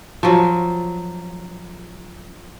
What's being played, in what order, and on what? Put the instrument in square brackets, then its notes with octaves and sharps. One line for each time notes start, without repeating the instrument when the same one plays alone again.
[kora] F3 F#3